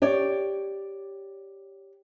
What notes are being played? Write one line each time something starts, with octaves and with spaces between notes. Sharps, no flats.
G4 C#5 D5